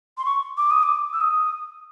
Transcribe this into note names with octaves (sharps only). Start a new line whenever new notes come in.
C6
C#6
D6
D#6
D6
E6
D#6